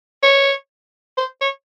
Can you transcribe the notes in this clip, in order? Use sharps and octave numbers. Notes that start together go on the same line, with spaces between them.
C#5
C5
C#5